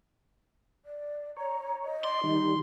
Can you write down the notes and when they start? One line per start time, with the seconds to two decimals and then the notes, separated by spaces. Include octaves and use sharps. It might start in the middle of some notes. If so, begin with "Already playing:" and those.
0.85 D5
1.37 C#5 A#5
1.83 D#5
2.04 D5 C6
2.24 D#3 G3 D#4